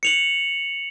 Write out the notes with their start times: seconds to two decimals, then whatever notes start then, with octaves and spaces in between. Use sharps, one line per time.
0.03 C#7 F7 F#7